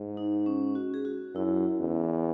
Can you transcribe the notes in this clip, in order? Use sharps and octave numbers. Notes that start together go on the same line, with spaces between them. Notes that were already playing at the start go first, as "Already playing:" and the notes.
Already playing: G#2
D#4
C#4
F#4
G#4
F#4
F#2 E4
E2